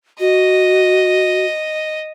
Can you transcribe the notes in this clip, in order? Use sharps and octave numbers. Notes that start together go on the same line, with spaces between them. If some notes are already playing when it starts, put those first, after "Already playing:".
F#4 D#5